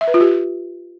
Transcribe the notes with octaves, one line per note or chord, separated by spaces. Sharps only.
E5
B4
F4
G4